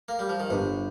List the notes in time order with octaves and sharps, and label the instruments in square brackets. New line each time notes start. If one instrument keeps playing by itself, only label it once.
[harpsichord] A#3
G3
F3
D#3
[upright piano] G1 [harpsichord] C3